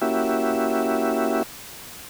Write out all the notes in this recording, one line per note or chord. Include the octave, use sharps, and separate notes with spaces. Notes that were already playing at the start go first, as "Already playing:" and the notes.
A#3 C#4 E4 F#4 G4 E5